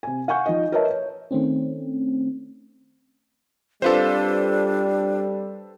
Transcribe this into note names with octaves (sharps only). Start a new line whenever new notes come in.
C3 G#5
F5 F#5 G#5 C#6 G6
F3 D#4 D#5
A#4 B4 C#5 D#5 E5 A5
C#5
D#3 A3 C4 C#4
G3 C4 D4 F4 G4 A4 B4 C5